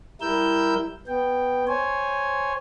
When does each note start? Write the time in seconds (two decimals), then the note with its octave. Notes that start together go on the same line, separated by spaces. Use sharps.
0.21 G3 E4 A#4 E6 G6
1.07 B3 G5
1.68 C5 C#5 G#5